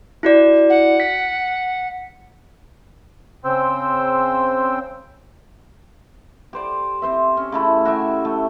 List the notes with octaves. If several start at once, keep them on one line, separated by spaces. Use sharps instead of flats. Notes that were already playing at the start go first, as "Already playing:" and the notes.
E4 F#4 D5
F#5
B6
C#3 C4 C5 G5 E6
G4 C5 D5
C4 C5 E5
C#4
C#3 A3 E4
F#4 G4 E5 G#5
A3